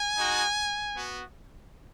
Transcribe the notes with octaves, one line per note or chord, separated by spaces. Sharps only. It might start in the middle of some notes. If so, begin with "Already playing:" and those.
Already playing: G#5
G#3 D#4 F#4
B3 F#4